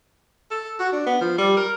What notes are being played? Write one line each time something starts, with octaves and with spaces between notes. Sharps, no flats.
A4
F#4
D4
B3
F3
G3
A#4